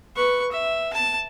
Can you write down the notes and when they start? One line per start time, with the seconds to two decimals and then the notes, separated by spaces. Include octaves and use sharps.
0.16 B4 C#6
0.52 E5
0.93 A5